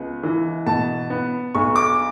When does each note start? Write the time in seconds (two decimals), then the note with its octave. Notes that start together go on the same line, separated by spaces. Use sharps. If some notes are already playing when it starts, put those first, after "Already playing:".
Already playing: C#2 B3
0.23 E3
0.67 B2 A5
1.10 B3
1.55 B1 C#6
1.76 D6